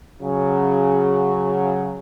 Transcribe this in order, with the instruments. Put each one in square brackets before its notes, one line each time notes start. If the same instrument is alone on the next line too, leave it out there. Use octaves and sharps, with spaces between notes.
[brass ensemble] C#3 F#3